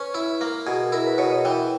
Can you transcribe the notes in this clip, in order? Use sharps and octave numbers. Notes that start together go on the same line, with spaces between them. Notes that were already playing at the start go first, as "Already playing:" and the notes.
Already playing: C#4 B4
E4
A#3 A#4
B2 G#4
E4 A#4
B4
B2 C#5
D#5
E3 G5